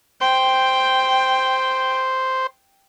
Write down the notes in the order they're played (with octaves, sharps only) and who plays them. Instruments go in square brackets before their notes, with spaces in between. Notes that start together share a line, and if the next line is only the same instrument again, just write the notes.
[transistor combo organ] C5 [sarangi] G5